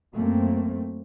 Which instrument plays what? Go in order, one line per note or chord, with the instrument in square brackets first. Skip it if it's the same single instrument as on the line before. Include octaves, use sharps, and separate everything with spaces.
[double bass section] F#2 A3 A#3 C4